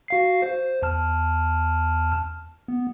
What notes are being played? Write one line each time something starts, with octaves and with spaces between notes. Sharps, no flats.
F#4 F5 C7
C5
E2 A5 F6
B3